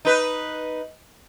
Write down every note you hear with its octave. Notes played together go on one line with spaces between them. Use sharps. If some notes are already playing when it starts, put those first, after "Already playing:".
D#4 B4